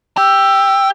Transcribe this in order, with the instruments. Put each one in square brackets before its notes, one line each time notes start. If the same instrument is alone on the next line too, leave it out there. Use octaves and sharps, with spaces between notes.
[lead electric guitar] G4 [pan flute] E6